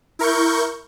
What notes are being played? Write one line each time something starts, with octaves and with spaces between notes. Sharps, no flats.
E4 A#4 C#6 G6